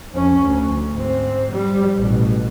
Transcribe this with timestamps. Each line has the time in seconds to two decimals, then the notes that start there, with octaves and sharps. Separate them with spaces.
0.12 F2 C#4
0.44 D2
0.93 G#2 C4
1.52 G3
1.97 A1 B2